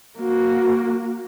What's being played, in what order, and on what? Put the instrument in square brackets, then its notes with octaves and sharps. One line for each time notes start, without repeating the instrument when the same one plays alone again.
[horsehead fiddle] A#3 F#4